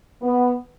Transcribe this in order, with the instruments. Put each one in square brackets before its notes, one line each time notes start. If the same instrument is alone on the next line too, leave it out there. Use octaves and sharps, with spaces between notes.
[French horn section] B3